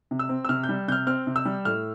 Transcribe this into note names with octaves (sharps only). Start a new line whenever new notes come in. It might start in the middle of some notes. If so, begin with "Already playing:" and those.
C3
E6
C4
E6
C3 F6
G6
G3
C3 F6 G6
C4 F6
C3
E6
G3
A2 F6